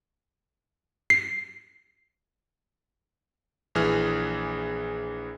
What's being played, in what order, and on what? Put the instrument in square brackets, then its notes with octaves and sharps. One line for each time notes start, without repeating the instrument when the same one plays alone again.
[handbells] C7
[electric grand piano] A#1 E3 G#4 F6